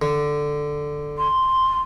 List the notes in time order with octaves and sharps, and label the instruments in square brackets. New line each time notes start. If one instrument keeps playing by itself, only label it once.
[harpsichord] D3
[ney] C6